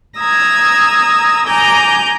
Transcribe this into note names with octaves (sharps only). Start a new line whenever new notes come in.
A#5 D#6 E6 G#6
G#5 A#5 D6 G6